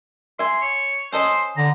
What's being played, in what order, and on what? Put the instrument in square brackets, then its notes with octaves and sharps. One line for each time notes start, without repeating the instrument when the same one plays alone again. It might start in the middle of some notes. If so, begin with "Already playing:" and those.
[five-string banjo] E5 G#5 [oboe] C6
[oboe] C#5
[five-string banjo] C#4 A4 D#5 [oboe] C5
[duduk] D3 [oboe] A#5